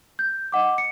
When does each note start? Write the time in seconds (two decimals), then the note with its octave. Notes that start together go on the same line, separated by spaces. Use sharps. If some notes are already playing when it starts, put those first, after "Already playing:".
0.19 G6
0.52 D#5 F#5 D6
0.78 C#7